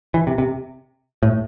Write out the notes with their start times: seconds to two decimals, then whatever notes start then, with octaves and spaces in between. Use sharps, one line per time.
0.14 E3
0.27 C3
0.38 C3
1.23 A2